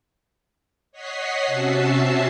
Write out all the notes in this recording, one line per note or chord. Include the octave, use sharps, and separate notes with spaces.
C#5 D#5 F#5 B6 C7
C3 C#4 F#4 E5 A5 C7